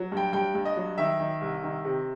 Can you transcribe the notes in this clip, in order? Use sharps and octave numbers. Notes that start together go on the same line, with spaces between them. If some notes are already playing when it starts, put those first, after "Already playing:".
Already playing: F#3
G2 G5
G2 G5
G2
D#5
F#3
D#3 E5
D#3
C2
D#3
C3